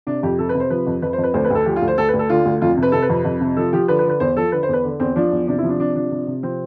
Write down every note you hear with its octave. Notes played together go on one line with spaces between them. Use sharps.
C3 D4
F2 G4
C3 A4
B4
C3
C5
F3 B4
F2
F2 B4
C5
F2
B4
D2 C5
B4
D2 A4
F3 G4
F4
D2
C5
D2 A4
B4
D2
A4
D3 F4
D2
F2 F4
C3
B4
C3 A4
B4
F2
F2
C3
F3 A4
F3 G4
D3 B4
B4
D3
B4
E2 C5
F3 A4
D3 B4
C5
E2 B4
D3
E2 C4
F3 D4
E2
C3 D4
E4
F3
D4
C3 D4
F3 D4
C3
C3
F3 C4